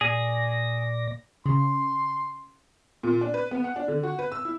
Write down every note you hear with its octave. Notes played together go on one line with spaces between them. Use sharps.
A#2 G#4 D5 A#6
C#3 C6
A#2
D4
B4
B3
F#5
D4
D3
F#4
B4
E6
E4